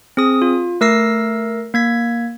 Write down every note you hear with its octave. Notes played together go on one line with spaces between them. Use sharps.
C4 G#4 D#6
F4
A3 A#4 E6 A#6 C7
A#3 G#6 B6